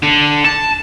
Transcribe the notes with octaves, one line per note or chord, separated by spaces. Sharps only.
D3
A5